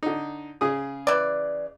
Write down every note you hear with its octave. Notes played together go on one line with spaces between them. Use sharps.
D3 D#4
C#3 G#4 D#6
E3 D5